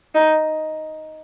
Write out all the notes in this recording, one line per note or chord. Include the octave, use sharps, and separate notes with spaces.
D#4